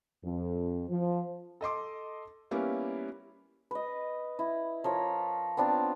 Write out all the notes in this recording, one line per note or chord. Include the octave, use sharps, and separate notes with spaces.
F2
F3
A4 D#5 C6 D6
G3 A#3 B3 C#4 E4
B4 D#5
E4
F3 A#4 C#5
B3 C4 D4 F4